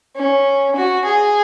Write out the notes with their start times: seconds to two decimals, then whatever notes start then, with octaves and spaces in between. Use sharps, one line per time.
0.16 C#4
0.76 F#4
1.05 G#4